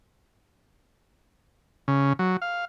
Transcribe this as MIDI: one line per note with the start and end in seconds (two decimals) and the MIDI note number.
1.88 2.13 49
2.19 2.37 54
2.42 2.65 77